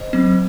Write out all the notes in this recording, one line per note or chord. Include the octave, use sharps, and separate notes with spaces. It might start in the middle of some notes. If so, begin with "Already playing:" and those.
Already playing: C5 D#5
F#3 C4